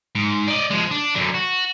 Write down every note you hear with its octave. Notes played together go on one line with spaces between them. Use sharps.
G#2
D5 D#5
F3 G#3
D4
F#2 D3
F#4